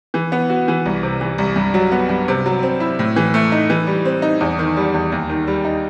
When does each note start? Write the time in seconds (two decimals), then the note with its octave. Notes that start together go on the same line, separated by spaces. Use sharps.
0.14 E3
0.32 B3
0.50 F#4
0.68 E3
0.86 C2
1.03 C3
1.21 E3
1.38 C2
1.56 G2
1.74 F#3
1.92 B3
2.09 G2
2.28 C3
2.46 F#3
2.63 C4
2.80 E4
2.99 A2
3.16 E3
3.34 A3
3.52 D#4
3.70 E3
3.87 G3
4.05 C4
4.22 D#4
4.40 E2
4.59 D#3
4.77 G3
4.94 E2
5.12 D#2
5.29 D#3
5.47 G3
5.65 D#4